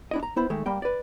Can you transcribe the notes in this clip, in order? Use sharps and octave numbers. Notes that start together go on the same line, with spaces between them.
D4 E4 D#5
A#5
B3 E4 C5
D#3 G#3 A3
G3 A#3 G5
B4 D5